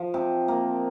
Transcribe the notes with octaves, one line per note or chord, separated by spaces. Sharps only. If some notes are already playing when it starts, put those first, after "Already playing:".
Already playing: F3
C3
A#3